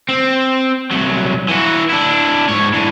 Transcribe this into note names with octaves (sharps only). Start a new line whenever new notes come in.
C4
C2 F#3
E3 F#4
D4 E4
G#2 C#5
D3 E3